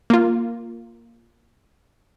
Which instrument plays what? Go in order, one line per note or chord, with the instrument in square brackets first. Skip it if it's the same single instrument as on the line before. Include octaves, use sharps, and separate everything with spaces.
[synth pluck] A#3 F4